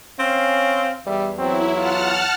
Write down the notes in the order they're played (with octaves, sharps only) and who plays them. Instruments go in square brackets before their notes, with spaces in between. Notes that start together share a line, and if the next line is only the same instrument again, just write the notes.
[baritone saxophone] C4 [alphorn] C#4 [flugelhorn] F5
[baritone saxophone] E2 [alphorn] G3 [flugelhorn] E5
[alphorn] F#3 [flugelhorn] C4 [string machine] E4
[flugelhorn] F4 [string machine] F#5 A5 F6